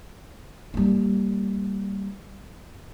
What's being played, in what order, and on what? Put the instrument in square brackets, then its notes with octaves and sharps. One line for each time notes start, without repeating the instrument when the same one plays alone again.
[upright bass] G3 A#3